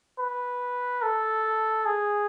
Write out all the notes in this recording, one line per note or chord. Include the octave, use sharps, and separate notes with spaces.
B4
A4
G#4